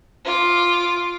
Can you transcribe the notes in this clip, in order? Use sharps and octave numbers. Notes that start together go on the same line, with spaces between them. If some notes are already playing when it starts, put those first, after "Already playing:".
F4 D6